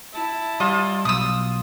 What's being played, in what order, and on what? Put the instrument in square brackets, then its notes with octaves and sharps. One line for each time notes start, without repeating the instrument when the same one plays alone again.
[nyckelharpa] E4 A5
[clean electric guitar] G3 [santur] F4 [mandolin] D#5
[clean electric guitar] B1 [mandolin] D#6 E6